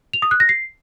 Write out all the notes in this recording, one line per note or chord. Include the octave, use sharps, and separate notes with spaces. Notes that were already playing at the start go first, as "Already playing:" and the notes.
F7
D#6
F#6
A#6
C7